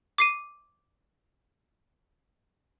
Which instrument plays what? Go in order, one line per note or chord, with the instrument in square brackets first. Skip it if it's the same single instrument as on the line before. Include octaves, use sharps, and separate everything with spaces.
[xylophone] D6 C7 D#7